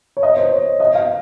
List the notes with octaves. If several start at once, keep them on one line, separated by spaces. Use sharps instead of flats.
C#5
D#5
C5
C#5
D#5
F5